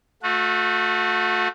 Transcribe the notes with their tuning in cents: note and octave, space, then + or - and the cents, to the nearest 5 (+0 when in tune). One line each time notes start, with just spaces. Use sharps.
A3 +0 F#4 -35